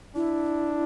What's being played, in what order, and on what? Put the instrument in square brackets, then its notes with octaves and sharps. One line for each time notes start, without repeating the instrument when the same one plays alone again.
[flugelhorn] D4 [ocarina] E4